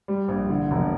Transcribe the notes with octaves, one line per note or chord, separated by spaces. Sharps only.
G3
A#1
D3
E1